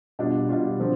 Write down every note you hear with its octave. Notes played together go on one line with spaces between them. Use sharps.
B2 G3 D4 F4
B2 G3 D4 F4
D3 F3 C4